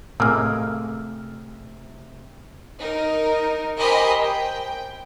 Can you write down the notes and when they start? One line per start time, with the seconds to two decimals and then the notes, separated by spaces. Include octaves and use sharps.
0.20 A2 C3 G#3 A#3 E6 F6
2.77 D#4 A#4
3.78 G4 A#4 C5 D#5 G#5 B5
4.21 G5